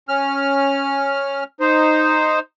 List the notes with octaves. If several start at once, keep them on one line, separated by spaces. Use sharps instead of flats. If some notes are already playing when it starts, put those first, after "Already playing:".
C#4 F6
D#4 C5